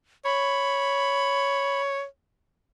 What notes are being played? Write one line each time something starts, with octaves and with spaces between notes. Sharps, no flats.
C#5 B5